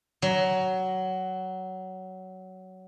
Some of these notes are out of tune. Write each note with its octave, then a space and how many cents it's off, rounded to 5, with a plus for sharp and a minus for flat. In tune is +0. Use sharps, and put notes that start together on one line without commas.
F#3 +15